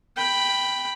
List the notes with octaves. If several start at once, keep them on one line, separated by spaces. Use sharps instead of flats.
G5 B5